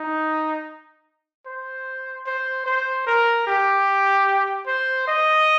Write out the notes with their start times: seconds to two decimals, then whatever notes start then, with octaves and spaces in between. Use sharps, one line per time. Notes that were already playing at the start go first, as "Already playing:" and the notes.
Already playing: D#4
1.46 C5
2.26 C5
2.66 C5
3.07 A#4
3.47 G4
4.67 C5
5.08 D#5